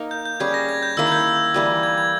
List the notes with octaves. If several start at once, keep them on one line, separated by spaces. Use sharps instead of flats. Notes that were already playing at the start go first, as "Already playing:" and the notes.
Already playing: A#3 D#4 A#4
G6
G6
G3 C#4 G#4 G#6
A#6
G#6
G6
D#3 A#3 E4 E6
G#6
G6
E3 G3 A#3
G#6
G#6